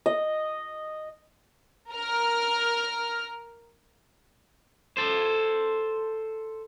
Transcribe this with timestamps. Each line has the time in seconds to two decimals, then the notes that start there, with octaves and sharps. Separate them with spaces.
0.06 D#5
1.92 A#4 F6
4.97 A4 C5